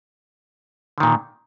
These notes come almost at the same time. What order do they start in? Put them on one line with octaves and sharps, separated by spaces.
D3 D#3 A#2